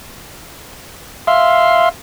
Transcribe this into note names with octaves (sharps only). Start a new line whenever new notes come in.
E5 F5 C6